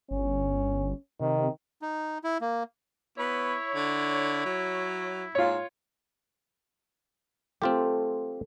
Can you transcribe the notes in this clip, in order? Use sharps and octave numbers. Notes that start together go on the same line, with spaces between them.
G1 C#4
C3 D#3
D#4
E4
A#3
B3 E4 C#5
D3
F#3
G#2 F4 C#5
A3 C4 F4 G4